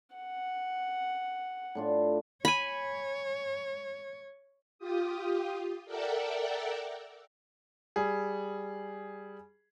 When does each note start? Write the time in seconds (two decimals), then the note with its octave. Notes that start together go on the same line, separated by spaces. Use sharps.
0.16 F#5
1.75 A2 D4 F4
2.45 C#5 G#5 B5
4.79 F4 G4 D#6
5.85 A4 A#4 D5 E5 F#5 G5
7.96 G3 G#4